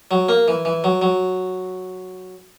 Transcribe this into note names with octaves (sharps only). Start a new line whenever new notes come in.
F#3
A#3
E3
E3
F#3
F#3